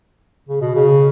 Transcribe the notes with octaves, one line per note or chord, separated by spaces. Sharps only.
C#3
B2
C#3